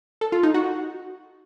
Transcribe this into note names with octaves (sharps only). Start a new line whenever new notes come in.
A4
F4
D#4
F#4